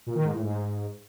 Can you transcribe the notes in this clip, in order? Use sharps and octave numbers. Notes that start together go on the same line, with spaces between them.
A#2
D#3
G#2
A2
G#2